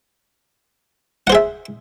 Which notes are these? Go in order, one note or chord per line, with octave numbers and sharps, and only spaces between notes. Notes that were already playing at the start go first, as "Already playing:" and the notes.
G#4 C5 E5 F#5